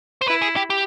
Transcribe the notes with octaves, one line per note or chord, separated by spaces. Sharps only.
C5
E4 B4
G#4
G4
G4